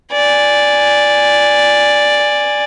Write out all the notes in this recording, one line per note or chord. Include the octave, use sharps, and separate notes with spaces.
D5 G#5